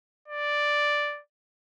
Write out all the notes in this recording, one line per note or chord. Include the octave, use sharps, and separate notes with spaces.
D5